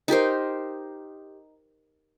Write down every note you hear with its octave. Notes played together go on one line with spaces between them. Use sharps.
D#4 G4 A#4 C5